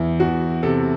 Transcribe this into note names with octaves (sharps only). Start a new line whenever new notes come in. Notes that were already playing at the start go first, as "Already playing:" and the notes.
Already playing: E2 E4
E2 F#4
C3 A4